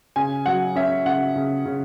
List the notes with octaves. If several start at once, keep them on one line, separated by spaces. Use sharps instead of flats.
C#3 G#5
F#3 F#5
C#4 E5
C#3 F#5
C#3
C#3